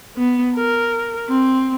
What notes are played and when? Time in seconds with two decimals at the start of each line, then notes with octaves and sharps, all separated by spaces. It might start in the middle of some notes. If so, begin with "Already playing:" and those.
0.17 B3
0.55 A#4
1.29 C4